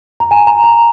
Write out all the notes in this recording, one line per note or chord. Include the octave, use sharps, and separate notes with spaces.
A#5
G#5
A#5
A#5